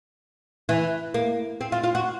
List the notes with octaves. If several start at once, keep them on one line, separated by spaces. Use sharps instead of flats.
E3
A#3
C4
F4
F4
F#4